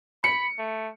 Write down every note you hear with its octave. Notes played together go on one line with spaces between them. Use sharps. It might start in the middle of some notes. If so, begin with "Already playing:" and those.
B5 C#7
A3